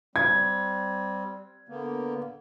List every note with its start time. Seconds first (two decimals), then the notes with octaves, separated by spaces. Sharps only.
0.16 G3 C4 G#6
1.69 D3 A#3 B3